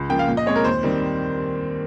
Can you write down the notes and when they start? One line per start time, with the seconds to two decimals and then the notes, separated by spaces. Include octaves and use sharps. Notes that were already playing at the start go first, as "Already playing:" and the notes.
Already playing: C#2
0.10 C#3 F3 A#3 G5
0.19 F5
0.28 A#2
0.37 D#5
0.46 G#3 C4 C#5
0.56 A#4
0.64 D#2 C5
0.83 D#3 G3 C4